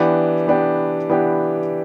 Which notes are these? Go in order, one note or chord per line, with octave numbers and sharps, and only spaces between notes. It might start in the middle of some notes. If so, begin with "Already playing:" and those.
Already playing: E3 B3 D4 G4
E3 B3 D4 G4
E3 B3 D4 G4